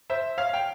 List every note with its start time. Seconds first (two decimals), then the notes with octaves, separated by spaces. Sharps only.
0.10 C5 E5
0.38 C#5 F5
0.53 G5